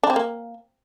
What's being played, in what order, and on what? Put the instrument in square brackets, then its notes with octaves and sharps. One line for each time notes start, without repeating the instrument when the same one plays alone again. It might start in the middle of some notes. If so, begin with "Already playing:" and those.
[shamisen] D4
C4
A#3